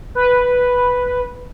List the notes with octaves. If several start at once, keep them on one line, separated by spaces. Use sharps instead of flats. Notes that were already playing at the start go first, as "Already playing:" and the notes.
B4